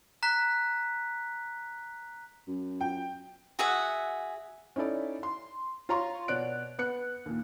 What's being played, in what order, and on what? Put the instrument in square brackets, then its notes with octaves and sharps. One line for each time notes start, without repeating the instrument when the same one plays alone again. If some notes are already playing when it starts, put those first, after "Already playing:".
[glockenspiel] A#5 F#6 B6
[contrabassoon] F#2
[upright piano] G5
[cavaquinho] F#4 G#4 E5 F#5
[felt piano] C#4 D#4 E4 A4 D5
C6
F4 C#5 A#5 C6 C#6
B2 C#5 D5 F#6 D7
B3 F#6 C#7
D#2 A#2